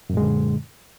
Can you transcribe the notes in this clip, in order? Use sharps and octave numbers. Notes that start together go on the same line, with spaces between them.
F#2 A#2 D3 G#3